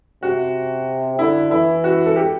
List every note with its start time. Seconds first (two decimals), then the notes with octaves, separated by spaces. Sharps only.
0.23 C3 F#4
1.19 D3 E4
1.51 E3 E4
1.84 F#4
2.06 A4
2.16 G4